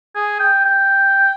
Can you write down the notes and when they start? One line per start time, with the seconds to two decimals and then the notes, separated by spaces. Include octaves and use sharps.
0.15 G#4
0.40 G5
0.65 G5